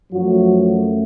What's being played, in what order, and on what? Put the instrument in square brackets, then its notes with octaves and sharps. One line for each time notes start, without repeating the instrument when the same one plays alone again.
[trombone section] F#2 F3 F#3 A3 F#4